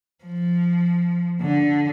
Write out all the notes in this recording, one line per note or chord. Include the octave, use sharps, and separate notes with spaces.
F3
D3